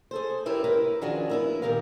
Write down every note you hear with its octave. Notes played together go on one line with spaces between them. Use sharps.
G#4 A4 C5
C4 E4 G4 A#4 B4 C#5
E4 A#4 B4
D#3 F3 C#4 D4 F#4 G#4
B3 E4 A#4
A#2 D#3 G4 A#4 F5